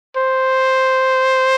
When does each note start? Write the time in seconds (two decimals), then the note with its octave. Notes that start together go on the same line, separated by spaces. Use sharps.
0.17 C5